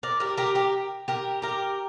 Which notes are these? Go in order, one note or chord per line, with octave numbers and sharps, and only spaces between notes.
A#4 D5
G4 A#4
G4 A#4
G4 A#4
G4 A#4
G4 A#4